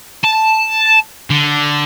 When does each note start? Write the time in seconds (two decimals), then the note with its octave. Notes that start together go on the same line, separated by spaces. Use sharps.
0.24 A5
1.30 D3